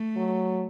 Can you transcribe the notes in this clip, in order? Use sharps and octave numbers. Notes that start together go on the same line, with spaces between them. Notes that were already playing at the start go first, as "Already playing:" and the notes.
Already playing: A3
F#3